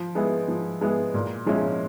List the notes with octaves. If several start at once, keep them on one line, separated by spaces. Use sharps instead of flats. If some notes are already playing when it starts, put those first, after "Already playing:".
Already playing: F3
G#3 B3 E4 G#4
F3
G#3 B3 E4 G#4
A#2
F3 G#3 C#4 E4